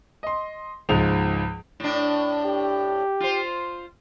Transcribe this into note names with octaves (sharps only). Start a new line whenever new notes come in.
D#5 C6
C#2 G#2 F3 G#3 F7
A2 D4
G4
F4 C5